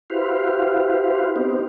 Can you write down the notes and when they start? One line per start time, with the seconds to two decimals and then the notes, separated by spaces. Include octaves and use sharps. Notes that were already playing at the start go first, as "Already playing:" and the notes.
0.10 E4 F#4 G4 B4 C5 F5
1.36 B3 C4 D#4 G4